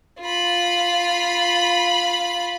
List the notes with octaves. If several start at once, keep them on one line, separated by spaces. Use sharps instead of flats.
F4 B5